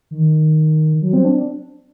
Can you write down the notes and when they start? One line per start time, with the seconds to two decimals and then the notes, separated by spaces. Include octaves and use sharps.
0.11 D#3
1.02 F#3
1.13 C4
1.25 D4